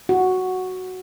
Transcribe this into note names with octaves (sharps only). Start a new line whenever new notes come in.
F#4